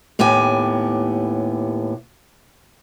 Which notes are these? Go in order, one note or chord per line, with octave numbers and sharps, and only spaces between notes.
D#2 A2 B3 G4 G#5